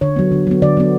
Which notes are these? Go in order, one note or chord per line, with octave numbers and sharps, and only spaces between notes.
D3 C#5
F#3 B3
D3
F#3 B3
D3 D5
F#3 B3